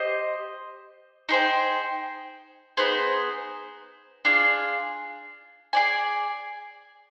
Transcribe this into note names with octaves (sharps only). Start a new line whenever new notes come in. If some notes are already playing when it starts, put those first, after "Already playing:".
Already playing: G4 C5 D#5
D#4 G#4 C5 G5
B3 D#4 G#4 C5
D4 F4 G#4
G#4 D5 G#5